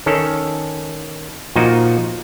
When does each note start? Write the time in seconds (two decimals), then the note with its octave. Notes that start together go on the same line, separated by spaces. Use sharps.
0.06 D#3 C#4 A4
1.56 A#2 F3 D#4 F#4 D#5